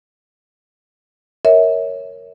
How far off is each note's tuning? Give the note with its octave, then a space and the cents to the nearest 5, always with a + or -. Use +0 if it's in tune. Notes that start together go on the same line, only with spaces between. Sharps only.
A#4 +0 C#5 +0 E5 -30